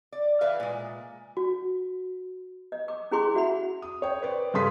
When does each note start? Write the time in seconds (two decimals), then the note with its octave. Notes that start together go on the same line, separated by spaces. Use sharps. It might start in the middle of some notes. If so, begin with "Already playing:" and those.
0.12 D5
0.41 E3 B4 E5 F5
0.60 A#2 G#3
1.37 F#4
2.72 D#5
2.88 D6
3.11 C#4 E4 G#4 B5 C6 D6
3.35 F#4 E5 F#5 B5
3.82 D#6
4.02 C#5 G5
4.22 B4 C5 D5
4.54 G2 C#3 A4 C6 D#6 B6